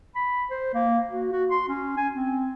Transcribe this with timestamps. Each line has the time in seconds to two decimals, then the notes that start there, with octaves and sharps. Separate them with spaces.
0.16 B5
0.50 C5
0.74 A#3
1.11 F#4
1.33 F#4
1.51 C6
1.69 C#4
1.97 G#5
2.15 C4